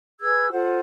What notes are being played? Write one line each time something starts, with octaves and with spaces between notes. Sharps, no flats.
G#4 B4 E6 G#6
F4 A4 C5 F#5